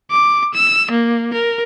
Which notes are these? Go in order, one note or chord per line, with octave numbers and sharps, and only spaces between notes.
D6
E6
A#3
A#4